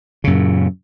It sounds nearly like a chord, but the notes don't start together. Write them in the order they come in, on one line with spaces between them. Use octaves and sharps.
C#3 F#2 A#2